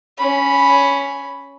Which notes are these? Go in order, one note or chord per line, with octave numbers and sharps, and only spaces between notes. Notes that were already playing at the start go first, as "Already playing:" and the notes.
C#4 B5